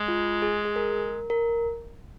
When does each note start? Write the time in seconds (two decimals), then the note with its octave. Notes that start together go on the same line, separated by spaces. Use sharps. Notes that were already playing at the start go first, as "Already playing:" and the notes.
Already playing: G#3
0.08 F4
0.42 G#4
0.65 G#4
0.76 A#4
1.30 A#4